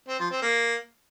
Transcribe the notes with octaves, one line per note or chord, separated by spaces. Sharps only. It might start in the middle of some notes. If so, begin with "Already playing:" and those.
C4
F3
C4
A#3